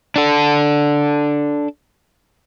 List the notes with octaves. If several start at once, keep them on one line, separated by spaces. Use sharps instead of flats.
D4 A4